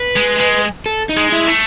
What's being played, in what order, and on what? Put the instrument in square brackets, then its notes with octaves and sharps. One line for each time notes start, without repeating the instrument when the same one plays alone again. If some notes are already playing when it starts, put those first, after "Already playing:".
Already playing: [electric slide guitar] B4
[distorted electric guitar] G#3
G#3
[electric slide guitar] A4
D#4
[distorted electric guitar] G#3
[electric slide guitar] E4
[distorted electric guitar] A3